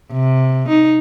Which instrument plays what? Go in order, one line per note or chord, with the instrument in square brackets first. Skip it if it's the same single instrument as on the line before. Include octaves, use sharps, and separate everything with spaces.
[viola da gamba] C3
D#4